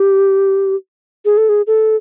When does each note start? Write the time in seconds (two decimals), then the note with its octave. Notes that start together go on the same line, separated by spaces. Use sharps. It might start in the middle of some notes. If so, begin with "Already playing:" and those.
Already playing: G4
1.25 G#4
1.37 A4
1.49 G#4
1.67 A4